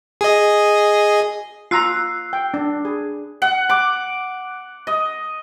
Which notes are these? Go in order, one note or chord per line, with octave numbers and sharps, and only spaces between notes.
G#4 D#5
F4 A#5 E6 F#6 C7
G5
D4
G#4
F#5
D6
D#5